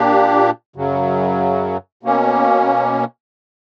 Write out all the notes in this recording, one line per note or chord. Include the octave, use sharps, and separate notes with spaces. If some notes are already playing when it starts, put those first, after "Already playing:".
Already playing: A#2 A#3 D4 G4
F#2 C#3 F#3
B2 A#3 C#4